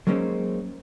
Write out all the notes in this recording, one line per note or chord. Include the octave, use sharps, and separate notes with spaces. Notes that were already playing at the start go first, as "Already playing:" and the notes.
F#3 G#3 A#3 C4 C#4 D#4